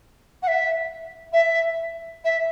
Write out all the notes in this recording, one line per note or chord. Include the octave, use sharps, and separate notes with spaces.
F#5
E5
E5
E5